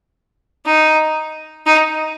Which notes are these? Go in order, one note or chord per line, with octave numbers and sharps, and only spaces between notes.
D#4
D#4